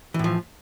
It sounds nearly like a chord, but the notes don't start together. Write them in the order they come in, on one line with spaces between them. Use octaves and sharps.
E3 A2 F3